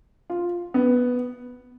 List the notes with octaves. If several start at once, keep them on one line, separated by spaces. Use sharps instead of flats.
F4
B3